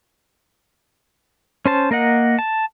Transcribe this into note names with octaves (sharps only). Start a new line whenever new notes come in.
C#4 C5 A5
A#3 A#4 D#5 F#5
A5